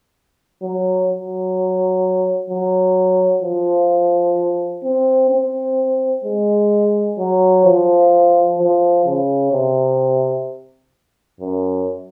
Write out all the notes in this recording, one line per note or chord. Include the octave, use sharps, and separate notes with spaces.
F#3
F#3
F#3
F3
C4
C4
G#3
F#3
F3
F3
C#3
C3
F#2